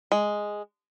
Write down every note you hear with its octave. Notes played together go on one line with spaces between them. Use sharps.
G#3